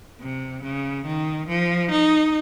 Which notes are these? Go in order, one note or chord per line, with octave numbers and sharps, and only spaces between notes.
C3
C#3
D#3
F3
D#4